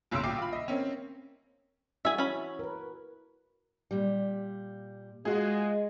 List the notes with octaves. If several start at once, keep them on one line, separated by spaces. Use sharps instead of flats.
F#1 B1 C#3 C6 E6 D7
A#1 G5 D6 C7
F4 B5
D#5 E5
A#3 C4 C#4
E4 F#4 G#4 E5
C#4 B5
A#4 B4
A#2 G3
G#3 F4 F#4 G#4